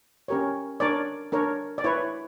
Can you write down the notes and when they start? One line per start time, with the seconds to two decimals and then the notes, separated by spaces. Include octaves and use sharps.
0.28 C#4 G4 A#4 C#5
0.80 D4 A#4 C#5 D5
1.32 D4 A#4 C#5
1.78 D5
1.84 E4 B4 C#5